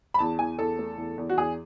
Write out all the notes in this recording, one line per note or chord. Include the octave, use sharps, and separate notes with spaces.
B5
E2 A5
E2 G#5
E2 A4
A3
E2
E2
F#4
E2 G#4